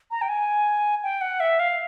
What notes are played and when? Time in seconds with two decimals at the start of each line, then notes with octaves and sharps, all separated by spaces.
0.11 A#5
0.22 G5
0.29 G#5
1.03 G5
1.21 F#5
1.40 E5
1.60 F5